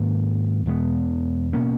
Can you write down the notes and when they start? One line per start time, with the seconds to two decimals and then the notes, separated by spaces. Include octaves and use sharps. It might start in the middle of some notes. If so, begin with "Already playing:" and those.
Already playing: G#2 D#3 A#3 C#4
0.66 E2 B2 G#3 B3
1.53 B2 A#3 C#4